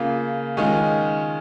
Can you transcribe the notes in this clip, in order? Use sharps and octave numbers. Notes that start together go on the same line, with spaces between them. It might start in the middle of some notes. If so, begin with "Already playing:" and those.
Already playing: C#3 A#3 F4
D#3 G#3 C#4 F4